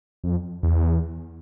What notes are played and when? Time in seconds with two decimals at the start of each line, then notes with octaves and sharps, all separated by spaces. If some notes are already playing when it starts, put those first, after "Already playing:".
0.24 F2
0.63 E2